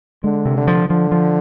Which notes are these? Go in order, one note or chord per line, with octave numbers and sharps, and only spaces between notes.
D3 G#3
C3
D3
F3
D3 F3
F3